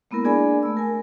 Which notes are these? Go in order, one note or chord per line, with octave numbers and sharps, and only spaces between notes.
G#3 A#3 B3 E4 A#4
D4 G#4 D5 G#5 B5
A3 E6
A#4 G#5